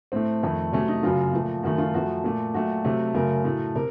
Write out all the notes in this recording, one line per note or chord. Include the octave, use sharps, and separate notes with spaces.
A2 A3 C4
F2 D#3 A3
C3 F#3 A3 C#4
D#4
F#2 C#3 F#3 F4
A#2 F3 A3
F#2 D#3 A3 F#4
F4
F#2 F3 A3 F#4
A#2 A3
A#2 F#3 A3 F#4
C3 F#3 A3
F#2 C#3 F#3 A3 A#4
A2 F#3 A3
C3 A#4